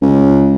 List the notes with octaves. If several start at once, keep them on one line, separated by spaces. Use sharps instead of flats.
C#2